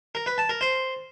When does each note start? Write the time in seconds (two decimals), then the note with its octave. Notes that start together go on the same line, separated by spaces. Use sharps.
0.15 A#4
0.26 B4
0.38 A5
0.49 A#4
0.61 C5